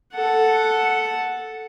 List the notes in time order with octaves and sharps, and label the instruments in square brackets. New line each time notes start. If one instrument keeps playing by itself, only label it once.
[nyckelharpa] A4 F#5